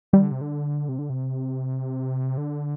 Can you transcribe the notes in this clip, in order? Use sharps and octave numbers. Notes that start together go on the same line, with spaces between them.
D#3 G3
D3
C3
D3
C3
D3
C3
D3